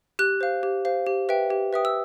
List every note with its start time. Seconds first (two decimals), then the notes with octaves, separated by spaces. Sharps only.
0.19 G4 F#6
0.41 C5 F5
0.63 G4
0.85 C5 F5
1.06 G4
1.29 B4 E5 G5
1.50 G4
1.73 B4 E5 G5 D#6
1.85 E6